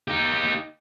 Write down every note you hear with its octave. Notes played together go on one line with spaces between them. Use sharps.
D#4 G4